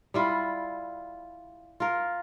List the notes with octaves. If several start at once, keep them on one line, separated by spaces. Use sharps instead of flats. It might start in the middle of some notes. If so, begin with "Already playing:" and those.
G3 E4 F4
F4 A#4